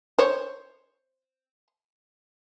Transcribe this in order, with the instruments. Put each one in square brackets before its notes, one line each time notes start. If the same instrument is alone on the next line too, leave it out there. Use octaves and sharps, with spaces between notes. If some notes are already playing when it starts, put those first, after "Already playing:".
[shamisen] C5 C#5